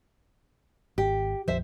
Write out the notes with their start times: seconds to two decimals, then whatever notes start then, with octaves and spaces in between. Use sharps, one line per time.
0.98 G#1 G4
1.48 A#1 F2 F3 C5 E5